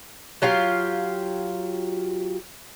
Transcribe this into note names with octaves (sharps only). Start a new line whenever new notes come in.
F#3 F4 G4 F5